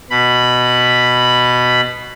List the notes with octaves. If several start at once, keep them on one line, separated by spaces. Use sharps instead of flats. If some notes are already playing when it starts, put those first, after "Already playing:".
B2 B5